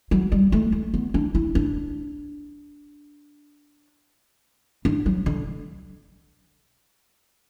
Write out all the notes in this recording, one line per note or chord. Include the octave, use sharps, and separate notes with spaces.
F#3
G3
A3
A3
B3
D4
E4
D4
D4
F#3
D3